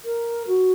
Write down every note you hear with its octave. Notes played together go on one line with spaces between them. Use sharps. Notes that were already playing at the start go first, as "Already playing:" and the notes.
A#4
F#4